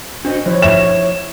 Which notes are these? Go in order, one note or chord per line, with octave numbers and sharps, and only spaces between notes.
D4 F#4 C5 D#5
F3 E4 C5 C#5
E5 E7